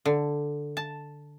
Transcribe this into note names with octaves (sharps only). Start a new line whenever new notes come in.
D3
A5